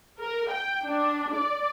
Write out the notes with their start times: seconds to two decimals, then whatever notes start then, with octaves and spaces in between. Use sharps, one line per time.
0.21 A#4
0.50 G5
0.87 D4
1.35 D5